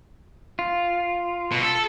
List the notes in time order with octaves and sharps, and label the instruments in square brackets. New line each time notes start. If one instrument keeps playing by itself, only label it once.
[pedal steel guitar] F4
[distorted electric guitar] B2
A4